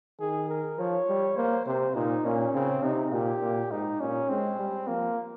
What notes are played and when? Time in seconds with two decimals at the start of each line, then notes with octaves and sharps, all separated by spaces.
0.20 D#3 G#4
0.49 A#4
0.78 F3 C#5
1.08 G3
1.37 A#3 C5
1.66 C3 C5
1.95 A#2 D#4
2.25 A#2 C#4
2.54 C#3 C4
2.83 C3 D#4
3.12 A#2 G4
3.41 A#2
3.71 G#2 D#4
4.00 A#2 C#4
4.29 G#3 C4
4.58 G3
4.87 F3 A#3